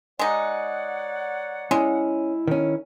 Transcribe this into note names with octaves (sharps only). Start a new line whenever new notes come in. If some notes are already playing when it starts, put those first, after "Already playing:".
G#3 D#4 C#5 D5 F#5
G#3 C#4 E4
D#3 C#4